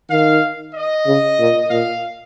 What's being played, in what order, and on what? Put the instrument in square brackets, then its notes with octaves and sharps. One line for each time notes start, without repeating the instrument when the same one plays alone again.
[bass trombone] D#3 [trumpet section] F5
[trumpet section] D#5
[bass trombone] C#3
A#2
[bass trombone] A#2 [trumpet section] F5